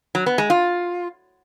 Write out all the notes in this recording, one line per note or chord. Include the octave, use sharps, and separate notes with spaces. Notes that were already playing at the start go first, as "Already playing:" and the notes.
F#3
B3
G#3
F4